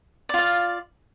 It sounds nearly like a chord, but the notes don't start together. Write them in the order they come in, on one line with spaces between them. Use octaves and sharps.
D5 F4 F5